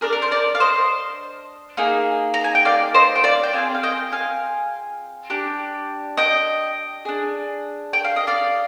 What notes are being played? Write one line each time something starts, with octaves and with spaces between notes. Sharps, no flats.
D4 G#4 A#4 D5
A#4
C5
A#4 D5
F5
C5 D#5
A#3 D#4 G#4
A#5
G#5
G5
D5 F5
C5 D#5
G5
D5 F5
G5
C4 F4 G#4 F5 G#5
F5
D#5 G5
F5 G#5
D4 G4
D#5 G5
D4 G#4
G5
F5
D#5
D5 F5